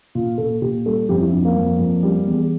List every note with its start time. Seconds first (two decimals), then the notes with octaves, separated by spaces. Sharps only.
0.15 A#2 F4
0.38 A#2 A4
0.62 A#2 G4
0.86 G3 A4
1.09 F2 G4
1.21 E4
1.32 F2 D4
1.45 A#3
1.57 F2
1.79 F2
2.03 G3
2.27 E2